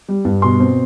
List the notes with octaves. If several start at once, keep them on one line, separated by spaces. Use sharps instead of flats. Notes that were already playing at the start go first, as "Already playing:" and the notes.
G3
G2
B2 C6
C4